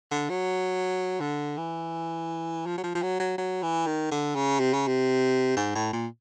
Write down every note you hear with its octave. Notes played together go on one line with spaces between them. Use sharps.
D3
F#3
D3
E3
F3
F#3
F3
F3
F#3
F#3
F#3
E3
D#3
D3
C#3
C3
C#3
C3
G#2
A2
A#2